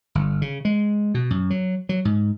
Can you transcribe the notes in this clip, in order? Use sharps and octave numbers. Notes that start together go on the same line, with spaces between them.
G1
C#3
G#3
B2
F#2
F#3
F#3
G#2